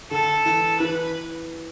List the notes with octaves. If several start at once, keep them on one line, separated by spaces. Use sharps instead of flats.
D3 A4
E3
E3 B4